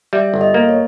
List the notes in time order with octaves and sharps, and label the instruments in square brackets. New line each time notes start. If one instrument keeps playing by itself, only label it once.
[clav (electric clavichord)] G3 [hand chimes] E5
[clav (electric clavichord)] G1
[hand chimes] D#5
[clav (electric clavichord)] A#3
[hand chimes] C#5